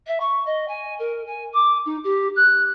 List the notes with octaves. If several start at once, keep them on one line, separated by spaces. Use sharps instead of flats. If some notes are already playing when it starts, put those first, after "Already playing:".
E5
C#6
D#5
G#5
A#4
G#5
D6
D#4
G4
F#6